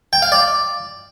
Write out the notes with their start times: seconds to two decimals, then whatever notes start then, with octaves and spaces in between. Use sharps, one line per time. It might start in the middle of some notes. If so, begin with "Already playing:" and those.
0.13 G5
0.22 F5
0.32 D5